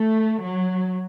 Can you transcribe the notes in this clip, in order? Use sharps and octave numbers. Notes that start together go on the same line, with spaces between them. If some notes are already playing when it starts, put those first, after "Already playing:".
Already playing: A3
F#3